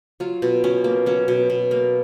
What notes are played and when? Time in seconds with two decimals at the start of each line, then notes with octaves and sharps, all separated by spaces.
0.20 F#3 F4
0.42 B2
0.64 B2 C#4
0.84 A#3
1.06 F#3 C#4
1.28 B2
1.50 B2
1.71 A#3